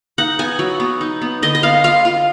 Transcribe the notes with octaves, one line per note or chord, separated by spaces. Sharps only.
D#4 F#5
B3 G#5
F#3
B3
D#4
B3
D3 D#5
D#5
B3 F5
F4 F5
F4